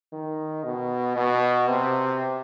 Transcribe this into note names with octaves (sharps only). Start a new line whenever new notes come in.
D#3
B2
B2
C3